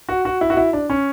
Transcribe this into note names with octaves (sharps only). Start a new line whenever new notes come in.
F#4
F#4
E4
F#4
E4
D4
C#4